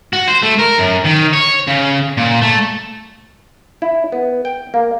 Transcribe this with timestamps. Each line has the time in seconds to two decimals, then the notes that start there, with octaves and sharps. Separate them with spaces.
0.13 F#4
0.28 C5
0.42 A3
0.59 A#4
0.78 F#2
1.04 D#3
1.33 C#5
1.67 C#3
2.17 A#2
2.42 A3
3.82 E4
4.12 B3
4.45 G5
4.74 A#3